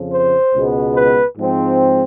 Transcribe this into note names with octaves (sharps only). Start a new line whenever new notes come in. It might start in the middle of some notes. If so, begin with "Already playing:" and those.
Already playing: F2 C#3 F3
C5
C#2 B2 G#3 B3
B4
G#2 F3 G#3 C4